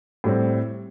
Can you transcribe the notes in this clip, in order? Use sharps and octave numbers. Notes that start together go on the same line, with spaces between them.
A2 G3 C4